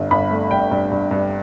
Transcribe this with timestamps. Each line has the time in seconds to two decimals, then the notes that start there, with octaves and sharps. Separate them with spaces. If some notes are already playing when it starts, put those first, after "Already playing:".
Already playing: G1 G2
0.11 G1 B5
0.31 A3
0.51 G2 G5
0.71 G2
0.91 G2
1.11 G2